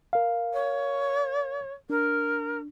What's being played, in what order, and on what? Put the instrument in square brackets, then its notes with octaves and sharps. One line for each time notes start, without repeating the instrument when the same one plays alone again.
[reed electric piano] A#4 F5
[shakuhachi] C#5
[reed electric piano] D4 [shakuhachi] A#4